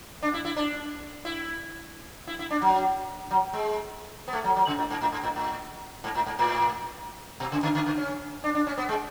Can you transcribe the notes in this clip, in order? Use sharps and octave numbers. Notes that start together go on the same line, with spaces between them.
D4
E4
E4
D4
E4
E4
E4
D4
F#3
F#3
G#3
B3
A3
F#3
F#3
C#3
A2
G#2
A2
G#2
A2
A2
G#2
A2
G#2
A2
B2
C#3
D3
D3
D3
C#4
D4
D4
C#4
B3
G#3